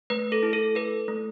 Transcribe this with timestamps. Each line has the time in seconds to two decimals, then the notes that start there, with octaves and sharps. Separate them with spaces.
0.10 A3 B4
0.32 A4
0.43 E4
0.53 A4
0.75 A4 B4
1.08 A3